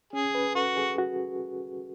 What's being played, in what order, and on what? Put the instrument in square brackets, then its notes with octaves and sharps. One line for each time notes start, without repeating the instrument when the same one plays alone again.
[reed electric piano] C#4 [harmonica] G#4
[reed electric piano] B4
[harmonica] F#4 [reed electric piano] A4
[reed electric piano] G#4
F#4